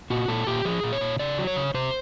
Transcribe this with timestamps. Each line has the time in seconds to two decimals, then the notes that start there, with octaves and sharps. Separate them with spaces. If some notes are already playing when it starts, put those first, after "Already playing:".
0.10 A#2 F#4
0.28 A#2 A4
0.47 A#2 G4
0.65 F3 G#4
0.83 A#2
0.93 C#5
1.01 A#2
1.19 C#3 D5
1.38 F#3
1.47 C#5
1.56 C#3
1.74 C3 C5